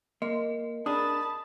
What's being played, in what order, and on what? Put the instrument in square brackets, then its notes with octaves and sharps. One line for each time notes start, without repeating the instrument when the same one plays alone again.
[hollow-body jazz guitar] A#3 [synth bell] D#5
[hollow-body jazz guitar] D4 G#4 A#4 [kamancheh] A5 B5 [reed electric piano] D#6